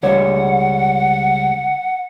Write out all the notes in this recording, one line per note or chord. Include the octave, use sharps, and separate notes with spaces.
C#2 G3 C#5 F#5